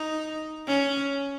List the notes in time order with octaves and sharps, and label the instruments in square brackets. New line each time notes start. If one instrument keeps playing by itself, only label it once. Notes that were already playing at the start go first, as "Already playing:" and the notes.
Already playing: [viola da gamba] D#4
C#4